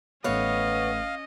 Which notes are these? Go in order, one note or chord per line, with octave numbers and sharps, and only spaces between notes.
A1 A3 B3 C#4 B4 C#5 D#5 F5